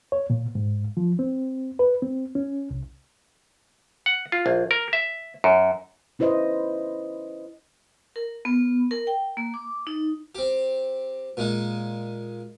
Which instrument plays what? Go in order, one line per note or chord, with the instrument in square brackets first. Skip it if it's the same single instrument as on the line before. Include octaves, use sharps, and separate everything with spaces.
[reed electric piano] C#5
A#2
G#2
F3
C4
B4
C4
C#4
C2
[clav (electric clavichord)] F#5
F4
A#1
A#4
E5
F#2
[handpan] C#4 E4 B4 C5 D#5
[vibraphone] A#4
B3
A#4
G5
A#3
D6
D#4
[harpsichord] C4 G4
A#2 G#3 D#4